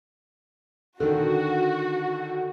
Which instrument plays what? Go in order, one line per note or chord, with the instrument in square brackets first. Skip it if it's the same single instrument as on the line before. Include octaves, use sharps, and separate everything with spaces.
[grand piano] D3 D#3 [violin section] F#4